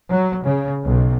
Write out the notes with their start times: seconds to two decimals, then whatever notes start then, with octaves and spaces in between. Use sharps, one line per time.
0.11 F#3
0.44 C#3
0.85 B1